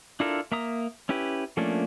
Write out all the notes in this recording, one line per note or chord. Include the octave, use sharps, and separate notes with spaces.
D4 E4 F4 A4 A#4
A#3 E5 A#5 D#6
C#4 E4 G4 B4
F3 A3 A#3 C#4 D4